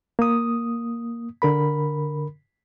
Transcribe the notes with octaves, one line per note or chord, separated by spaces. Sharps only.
A#3 D#6
D3 A#4 B5